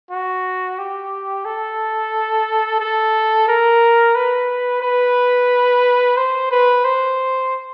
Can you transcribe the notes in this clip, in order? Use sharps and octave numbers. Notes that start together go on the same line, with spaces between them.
F#4
G4
A4
A4
A#4
B4
B4
C5
B4
C5